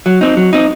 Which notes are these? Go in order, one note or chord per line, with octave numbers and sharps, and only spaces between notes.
F#3
C4 D#4
F#3
C4 D#4